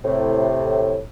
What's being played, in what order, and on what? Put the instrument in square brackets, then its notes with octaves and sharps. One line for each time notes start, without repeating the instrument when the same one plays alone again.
[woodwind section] A2 C3